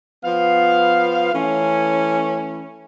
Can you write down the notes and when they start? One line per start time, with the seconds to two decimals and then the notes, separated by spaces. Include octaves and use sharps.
0.24 F3 B3 F5
1.34 E3 A3 C#4